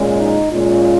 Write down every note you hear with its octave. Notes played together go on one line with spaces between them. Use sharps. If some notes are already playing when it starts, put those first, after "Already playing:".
Already playing: A#2 G#3 C#4
D#4
A#2 G#3 C#4 F4